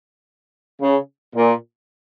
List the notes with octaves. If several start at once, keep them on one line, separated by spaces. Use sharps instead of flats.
C#3
A#2